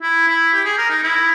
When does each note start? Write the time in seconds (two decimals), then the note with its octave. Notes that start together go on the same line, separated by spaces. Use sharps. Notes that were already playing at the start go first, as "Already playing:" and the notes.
0.02 E4
0.27 E4
0.53 G4
0.65 G#4
0.78 A#4
0.90 D#4
1.03 E4